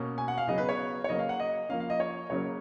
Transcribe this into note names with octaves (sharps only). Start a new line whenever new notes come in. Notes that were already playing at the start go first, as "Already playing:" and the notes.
Already playing: B2 A#3 C#4
G#5
F#5
F5
C#3 F#3 B3 D#5
B4
C#5
C#5
C#3 F#3 A#3 C#4 D#5
F5
F#5
D#5
F3 A#3 C#4 F5
F5
D#5
C#5
C#3 F#3 A#3 C#4 C#5